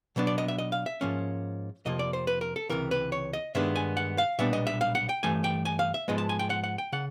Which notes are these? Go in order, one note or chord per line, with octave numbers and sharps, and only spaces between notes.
B2 F#3 B3 D4
D5
D#5
E5
D#5
F5
E5
G#2 F3 A#3 C#4
F2 C3 F3 A#3 D#5
D5
C5
B4
A#4
A4
C#2 C3 E3 A#4
B4
C#5
D#5
G2 D#3 G#3 B3 D4 E5
G#5
F#5
F5
B1 A#2 G3 B3 D4 E5
D#5
E5
F5
F#5
G5
G2 E3 A3 G#5
G5
G#5
F5
E5
G#2 F3 G#3 B3 D#5
A5
G#5
G5
F#5
F#5
G5
C#3 F#5